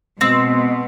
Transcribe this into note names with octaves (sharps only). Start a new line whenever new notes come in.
B2 G#3 C4